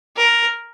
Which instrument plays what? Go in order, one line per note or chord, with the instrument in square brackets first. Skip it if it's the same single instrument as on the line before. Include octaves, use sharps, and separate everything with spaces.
[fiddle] A#4